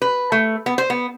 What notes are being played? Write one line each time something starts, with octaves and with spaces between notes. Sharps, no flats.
B4
A3
B3
C5
B3